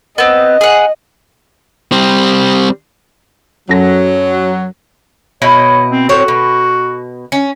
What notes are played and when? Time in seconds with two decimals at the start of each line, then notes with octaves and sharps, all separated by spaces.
0.18 B3 C4 D#5
0.61 G#4 F#5
1.92 G3 C4
3.69 F#2 F#3 A4 A#6
5.42 B2 E4 C#5 D#5
5.90 C4
6.09 A2 C4 F#4 C#5
6.28 B2
7.32 C#4